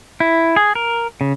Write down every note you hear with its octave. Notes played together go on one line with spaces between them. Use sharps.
E4
G#4
A#4
C#3